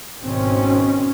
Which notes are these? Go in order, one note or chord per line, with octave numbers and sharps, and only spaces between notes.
G#1 B2 D#3 C4 C#4